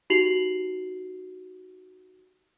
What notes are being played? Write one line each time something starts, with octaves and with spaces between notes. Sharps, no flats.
D#4 F#4 G4 C7 F7 F#7